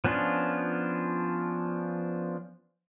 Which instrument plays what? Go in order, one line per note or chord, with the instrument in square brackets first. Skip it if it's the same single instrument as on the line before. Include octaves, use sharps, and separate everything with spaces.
[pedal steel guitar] F3 B3 C#4 D4 F4